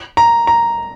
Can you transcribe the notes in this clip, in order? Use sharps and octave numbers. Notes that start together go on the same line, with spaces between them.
A#5
A#5